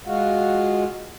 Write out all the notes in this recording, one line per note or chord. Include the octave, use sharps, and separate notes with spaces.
G#3 F4 F#4